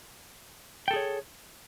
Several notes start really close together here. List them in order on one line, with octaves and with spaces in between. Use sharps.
G5 A4 G#4 C#5